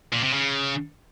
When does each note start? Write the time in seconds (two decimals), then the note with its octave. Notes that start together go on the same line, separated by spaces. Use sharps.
0.13 A#2
0.23 C3
0.33 C#3